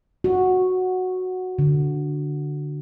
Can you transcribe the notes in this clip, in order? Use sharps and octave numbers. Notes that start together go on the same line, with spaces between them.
F#4
D3